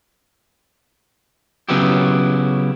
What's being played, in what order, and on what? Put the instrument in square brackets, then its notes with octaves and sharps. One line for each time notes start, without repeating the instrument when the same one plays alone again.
[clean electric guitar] C#3 F#3 B3 C#4 E4 G4